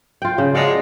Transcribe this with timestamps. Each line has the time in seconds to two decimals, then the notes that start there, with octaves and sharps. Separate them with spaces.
0.22 F4 G5
0.38 C#3
0.54 F3 F#3 G#3 D5 F5